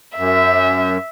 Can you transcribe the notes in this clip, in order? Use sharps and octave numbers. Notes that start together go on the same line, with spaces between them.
F#2 E5